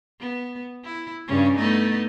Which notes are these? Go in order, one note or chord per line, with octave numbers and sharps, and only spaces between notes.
B3
E4
G2 C#3 C#4
A3 B3 D#4